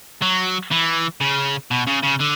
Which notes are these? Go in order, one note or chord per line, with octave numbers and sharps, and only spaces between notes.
F#3
E3
C#3
B2
C#3
C#3
D3